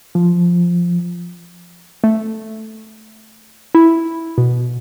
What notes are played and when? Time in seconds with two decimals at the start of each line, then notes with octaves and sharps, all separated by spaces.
0.15 F3
2.04 A3
3.75 E4
4.38 B2